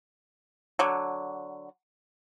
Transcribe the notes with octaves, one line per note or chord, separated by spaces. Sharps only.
D3 F#3